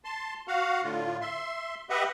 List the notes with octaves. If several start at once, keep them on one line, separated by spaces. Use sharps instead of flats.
A5 C6
F#4 F5 F#5
A2 D3 F4
E5 C6
G4 B4 D#5 E5 F#5